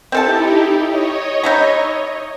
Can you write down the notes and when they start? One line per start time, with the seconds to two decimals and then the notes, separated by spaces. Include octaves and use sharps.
0.12 C4 D#4 E4 G4 A4 A5
0.81 C#5 D#5
1.43 D#4 E4 A#5